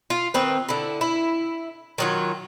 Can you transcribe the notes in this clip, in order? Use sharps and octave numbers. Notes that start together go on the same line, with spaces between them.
F4
D#3 C4 B4
D3 E4
E4
D#3 F#3 F4